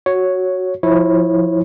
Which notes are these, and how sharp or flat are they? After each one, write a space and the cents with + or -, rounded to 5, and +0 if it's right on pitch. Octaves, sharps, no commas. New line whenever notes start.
F#4 +0 C#5 +0
F3 +5 E4 -15 C#5 -25